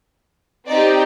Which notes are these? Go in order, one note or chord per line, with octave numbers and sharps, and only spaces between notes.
C4 D#4 G4 D5